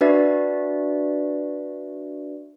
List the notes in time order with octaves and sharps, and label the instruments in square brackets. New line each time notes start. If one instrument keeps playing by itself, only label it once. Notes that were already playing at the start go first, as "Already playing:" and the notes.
[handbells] D4 F#4 B4 D5 E5